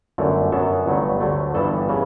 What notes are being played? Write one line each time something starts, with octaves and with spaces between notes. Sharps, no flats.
G1 F#2 D3 A3
F#2 D3 F#3 B3 A4
G1 G2 F#3 A3
D2 D3 F#3 A3
G1 G2 E3 G3 B3 A4
C#3 E3